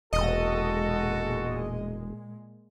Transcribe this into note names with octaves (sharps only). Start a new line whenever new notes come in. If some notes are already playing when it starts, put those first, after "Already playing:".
E1 A#2 G#3 F#4 A4 D#5